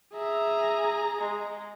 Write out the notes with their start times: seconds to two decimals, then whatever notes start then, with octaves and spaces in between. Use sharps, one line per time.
0.14 G#4 E5 A#5
1.19 G#3